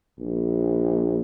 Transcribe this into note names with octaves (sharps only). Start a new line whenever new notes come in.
A#1